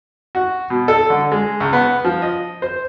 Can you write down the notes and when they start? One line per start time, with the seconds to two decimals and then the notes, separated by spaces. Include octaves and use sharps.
0.35 F#4
0.70 B2
0.88 A4
1.10 D3
1.32 G#3
1.60 C#2
1.73 B3
2.05 F3
2.22 D#5
2.62 C5